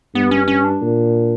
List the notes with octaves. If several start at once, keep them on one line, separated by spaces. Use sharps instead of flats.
G2 B3
C#4
C#4
D4
A#2